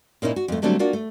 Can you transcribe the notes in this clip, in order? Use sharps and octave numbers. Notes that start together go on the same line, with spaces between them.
A#2 A#3 C#4 D#4 E4
F#4
F2 A3
D3 F#3 G3 A3 C4 D4
A#3 D4 F4 F#4
A3